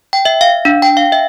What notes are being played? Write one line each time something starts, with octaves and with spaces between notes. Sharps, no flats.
G5
E5
F5
D4
G5
F5
E5